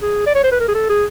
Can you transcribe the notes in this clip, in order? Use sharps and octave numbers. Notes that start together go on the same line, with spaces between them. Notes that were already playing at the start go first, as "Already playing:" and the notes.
G#4
D5
C#5
C5
B4
A#4
G#4
A4
G#4